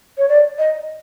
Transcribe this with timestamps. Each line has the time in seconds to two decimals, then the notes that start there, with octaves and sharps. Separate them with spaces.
0.17 C#5
0.28 D5
0.58 D#5